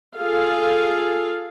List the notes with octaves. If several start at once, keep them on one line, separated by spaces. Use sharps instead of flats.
F4 G#4 A4 F5